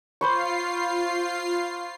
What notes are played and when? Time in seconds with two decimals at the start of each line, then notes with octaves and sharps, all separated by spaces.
0.21 F4 C5 B5 C#6 C7